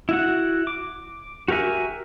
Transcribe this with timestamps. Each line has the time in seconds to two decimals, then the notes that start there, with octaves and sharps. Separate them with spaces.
0.09 E4 F#4 F#5
0.67 D6
1.48 F#4 G4 A#4 E5 G#5